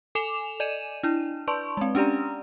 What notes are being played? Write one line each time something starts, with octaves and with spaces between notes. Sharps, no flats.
A4 G#5 D6 E7 F7
D5 D#5 G#5 D#7 E7
D4 E4
B4 D5 A5 C6 C#6
G#3 C4
C#4 D4 G4 D5 A#5